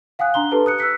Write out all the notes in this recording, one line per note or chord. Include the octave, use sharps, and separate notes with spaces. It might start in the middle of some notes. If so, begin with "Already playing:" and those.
F5 F#5 G#5 D#6 F#6
D4 A#5 C6 G7
G4 A4 B4 A5
D#6 F#6 C#7
E6 F#6 B6 C#7